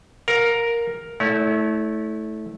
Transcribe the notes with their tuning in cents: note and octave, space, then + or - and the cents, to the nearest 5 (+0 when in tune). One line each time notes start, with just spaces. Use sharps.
A#4 +0 F5 +35
A3 -10 E4 -25 C#5 +35